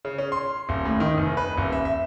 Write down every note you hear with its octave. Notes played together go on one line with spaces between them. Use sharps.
C#3
C#4
C6
D#1
A2
D#3
F1
B4
D#1
E5
E5